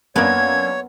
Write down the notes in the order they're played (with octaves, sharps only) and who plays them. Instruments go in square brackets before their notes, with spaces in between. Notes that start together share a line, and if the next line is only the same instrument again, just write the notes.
[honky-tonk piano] F#2 A#3 D4 [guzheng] B3 A#4 [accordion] C#5 [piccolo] G#6